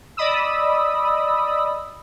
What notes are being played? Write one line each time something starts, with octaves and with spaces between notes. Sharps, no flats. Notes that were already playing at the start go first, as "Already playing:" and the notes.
D5 D#5 B5 D#6 E6